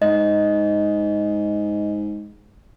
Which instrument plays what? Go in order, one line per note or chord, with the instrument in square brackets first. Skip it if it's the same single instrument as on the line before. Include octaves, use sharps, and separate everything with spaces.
[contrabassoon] G#2 [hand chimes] D#5